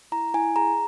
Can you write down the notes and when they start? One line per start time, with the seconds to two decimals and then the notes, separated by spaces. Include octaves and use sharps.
0.12 E4 A#5
0.34 E4 G#5
0.56 G#4 A#5